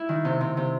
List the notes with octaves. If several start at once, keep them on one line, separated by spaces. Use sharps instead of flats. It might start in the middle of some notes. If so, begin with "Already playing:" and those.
Already playing: E4
D#3
C3
C3
C3